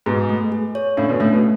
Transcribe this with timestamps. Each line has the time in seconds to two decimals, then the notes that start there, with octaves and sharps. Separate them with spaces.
0.06 G#2 B2 G#4
0.29 A3
0.52 G#4
0.75 C#5
0.97 A2 C#3 D4
1.08 B2 D3
1.20 A2 C#3 A3
1.32 B2